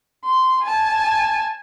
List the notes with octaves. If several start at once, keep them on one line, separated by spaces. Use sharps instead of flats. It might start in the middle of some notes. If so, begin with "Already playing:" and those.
C6
G#5 A5